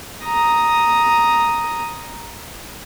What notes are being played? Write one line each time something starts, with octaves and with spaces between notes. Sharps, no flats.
A#5 D#6